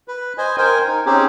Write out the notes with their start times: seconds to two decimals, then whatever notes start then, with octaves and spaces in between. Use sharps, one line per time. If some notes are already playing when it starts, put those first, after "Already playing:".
0.08 B4
0.38 C5 D#5 G#5
0.58 A#4 C5 G5 G#5
0.87 D#4
1.06 C4 C#4 D#4 G4 G#4